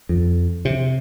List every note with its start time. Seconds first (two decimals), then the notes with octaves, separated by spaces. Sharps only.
0.09 F2
0.65 C3